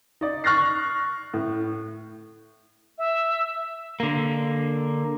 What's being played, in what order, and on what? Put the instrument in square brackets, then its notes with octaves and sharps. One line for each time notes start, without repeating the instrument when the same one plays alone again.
[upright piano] D#4 D5
C#6 F6 F#6 A6 A#6 C7
A2
[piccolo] E5
[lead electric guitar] D3 A#3